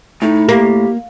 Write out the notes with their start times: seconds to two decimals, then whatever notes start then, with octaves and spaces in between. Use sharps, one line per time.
0.22 A2 D#4
0.49 A#3 G4